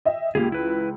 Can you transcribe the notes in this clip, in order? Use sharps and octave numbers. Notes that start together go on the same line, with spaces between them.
D#5 E5 G5
C#2 A#3 G4 G#4
E4 B4